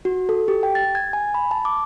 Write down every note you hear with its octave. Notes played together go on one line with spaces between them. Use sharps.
F#4
A4
G4
G5
A6
G#6
G#5
B5
A5
D6